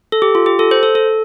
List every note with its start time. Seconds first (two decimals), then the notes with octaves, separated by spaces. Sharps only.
0.12 A4
0.22 G4
0.35 F4
0.46 G4
0.59 A4
0.71 C5
0.83 A4
0.95 A4